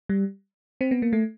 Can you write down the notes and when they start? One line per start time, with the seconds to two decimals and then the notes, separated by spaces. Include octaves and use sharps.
0.09 G3
0.81 C4
0.91 B3
1.02 A#3
1.13 A3